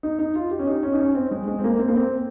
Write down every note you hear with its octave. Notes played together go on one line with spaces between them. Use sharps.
D#4
D#4
F4
G4
C#4
D#4
C#4
D#4
C#4
C4
G#3
G#3
C4
A#3
C4
A#3
C4